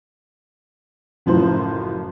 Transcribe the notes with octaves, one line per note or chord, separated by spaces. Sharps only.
F#1 F#2 A2 F3 C5